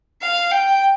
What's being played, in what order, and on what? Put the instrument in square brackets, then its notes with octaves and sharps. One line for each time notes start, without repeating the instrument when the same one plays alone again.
[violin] F5
G5